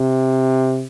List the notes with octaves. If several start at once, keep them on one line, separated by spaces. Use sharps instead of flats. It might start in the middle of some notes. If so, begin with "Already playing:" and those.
Already playing: C3